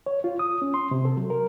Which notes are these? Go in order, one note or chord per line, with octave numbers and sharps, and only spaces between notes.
C#5
F4
D#6
C#4
C6
C3
A4
F#3
A#4